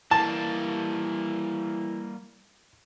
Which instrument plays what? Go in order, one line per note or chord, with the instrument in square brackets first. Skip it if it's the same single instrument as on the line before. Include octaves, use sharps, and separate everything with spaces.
[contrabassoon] E3 [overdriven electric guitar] G3 A#3 [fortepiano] A5